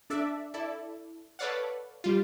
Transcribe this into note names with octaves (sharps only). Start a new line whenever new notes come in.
D4 A4 D5 E5
E4 A4 D5
A4 B4 C#5 D5 F5 F#5
G3 F4